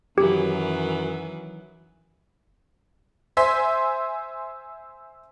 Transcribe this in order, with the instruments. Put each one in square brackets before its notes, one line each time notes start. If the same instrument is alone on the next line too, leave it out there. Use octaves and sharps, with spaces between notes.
[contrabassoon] F#2 [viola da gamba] D#3 E3 F#3 [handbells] G4
[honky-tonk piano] C5 E5 G#5 C6